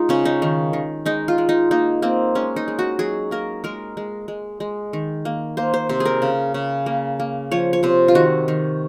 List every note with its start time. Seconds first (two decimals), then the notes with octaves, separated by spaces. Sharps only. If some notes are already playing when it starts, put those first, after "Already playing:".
Already playing: G#3 D#4 F4
0.09 C#3 C#4
0.25 D#4
0.42 D#3
0.73 D#3
1.06 G#3 D#4
1.28 F4
1.38 G#3
1.49 D#4
1.71 A#3 D#4
2.02 A#3 C4
2.35 G#3 C#4
2.56 D#4
2.68 G#3
2.79 F#4
2.99 F#3 G#4
3.31 A#3 A#4
3.64 G#3 A#4
3.97 G#3
4.28 G#3
4.60 G#3
4.93 D#3
5.25 A#3
5.57 A#3 C5
5.74 C5
5.89 C3 C5
6.00 G#4
6.05 A#4
6.22 C#3
6.54 C#3
6.86 A#3
7.20 A#3
7.51 F3 C#5
7.73 C#5
7.83 C3 C5
8.08 F4
8.15 D#3 F#4
8.48 D#3